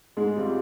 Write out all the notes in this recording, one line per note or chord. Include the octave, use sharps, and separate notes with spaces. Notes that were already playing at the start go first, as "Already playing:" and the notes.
G#2 G#3
G3 C4 F4